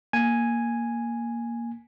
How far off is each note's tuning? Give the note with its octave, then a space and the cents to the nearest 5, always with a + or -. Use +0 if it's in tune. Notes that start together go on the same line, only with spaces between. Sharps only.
A#3 +5 G#5 +0